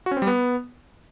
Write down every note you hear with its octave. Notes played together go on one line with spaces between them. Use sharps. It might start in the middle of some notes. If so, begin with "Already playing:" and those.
F#4
C#4
C4
G3
B3